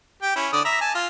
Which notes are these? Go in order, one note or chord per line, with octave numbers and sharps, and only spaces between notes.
G4 G5
C#4 E4
D3 D5 D#6
E5 A#5
G#5 A5
F4